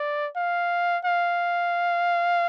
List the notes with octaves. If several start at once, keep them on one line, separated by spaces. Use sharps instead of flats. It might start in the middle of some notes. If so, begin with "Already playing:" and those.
Already playing: D5
F5
F5